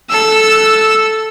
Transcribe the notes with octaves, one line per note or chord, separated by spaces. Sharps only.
A4 E6